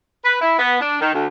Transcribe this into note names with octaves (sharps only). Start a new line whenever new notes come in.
B4
E4
B3
D4
D#3
D2